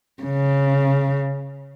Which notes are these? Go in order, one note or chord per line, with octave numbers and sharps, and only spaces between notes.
C#3